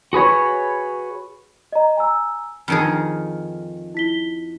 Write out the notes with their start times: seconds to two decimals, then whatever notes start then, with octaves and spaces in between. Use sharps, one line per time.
0.13 F#4 G#4 B4 C#5
1.72 D#5 A#5
1.97 G#5 A#5 E6
2.68 F2 D#3 G#4 F6 C#7 D7
3.95 E4 B6 G7